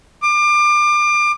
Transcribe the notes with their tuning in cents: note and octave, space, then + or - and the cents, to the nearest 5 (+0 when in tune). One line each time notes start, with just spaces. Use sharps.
D6 +30